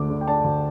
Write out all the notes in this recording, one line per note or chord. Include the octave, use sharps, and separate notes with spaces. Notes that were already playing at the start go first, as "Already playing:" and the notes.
Already playing: D2 A3 D4 D6
D3
G5
D4 A5
D2